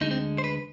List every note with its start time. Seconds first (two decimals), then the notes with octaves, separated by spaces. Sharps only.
0.01 D2 D3 G#3 D#4
0.11 C4
0.38 C5
0.44 B4